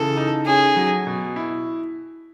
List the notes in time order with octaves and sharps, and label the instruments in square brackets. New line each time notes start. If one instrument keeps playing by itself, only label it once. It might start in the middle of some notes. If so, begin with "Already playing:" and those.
Already playing: [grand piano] C#3 E3 [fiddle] A4
[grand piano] D#4
[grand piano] C#4 [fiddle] G#4
[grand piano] F#3
B2
E4